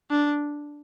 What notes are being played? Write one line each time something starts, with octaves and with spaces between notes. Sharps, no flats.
D4